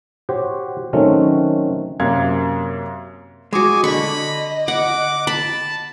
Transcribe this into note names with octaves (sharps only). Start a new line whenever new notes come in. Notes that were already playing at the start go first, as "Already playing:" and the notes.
F#4 G4 C5 C#5
D#3 F#3 A3 C4 C#4 F#4
F#2 C3 A#3 F5 C6 G#6
G#3 F#4 G#5 D6
D3 D#5 B5 C#6
F#5 D6
A5 B5